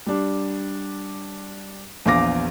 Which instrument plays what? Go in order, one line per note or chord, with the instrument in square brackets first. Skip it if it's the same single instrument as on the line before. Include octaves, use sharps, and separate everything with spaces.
[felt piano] G3 D4
A#1 E2 F5 D6 A#6